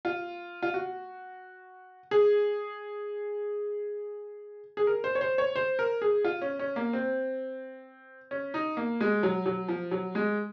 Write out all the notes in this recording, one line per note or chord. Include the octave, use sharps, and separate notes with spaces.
F4
F4
F#4
G#4
G#4
A#4
C5
C#5
C5
C#5
C5
A#4
G#4
F4
C#4
C#4
A#3
C4
C#4
D#4
A#3
G#3
F#3
F#3
F3
F#3
G#3